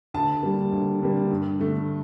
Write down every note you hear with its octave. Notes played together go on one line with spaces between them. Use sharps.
D2 A5
D3 G3 A#3
D2
D3 G3 A#3
G2
D3 A3